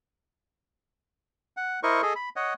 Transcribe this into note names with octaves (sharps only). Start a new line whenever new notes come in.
F#5
E4 A#4 C5 D#5 C#6
G#4 A4 D#5
B5
C#5 D#5 F#5